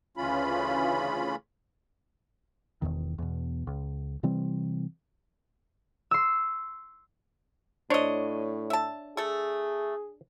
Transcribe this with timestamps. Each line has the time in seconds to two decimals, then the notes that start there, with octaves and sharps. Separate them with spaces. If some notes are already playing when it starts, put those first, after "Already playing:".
0.17 D2 C#3 E3 C#4 F4 B5
2.82 E1 A1 E2 D#3
3.18 E2 B2
3.67 C#2
4.23 C3 E3 G3 C4
6.11 C6 E6
7.90 A2 D4 C5 C#5 D#5
8.70 E5 A5
9.17 A3 G#4 A4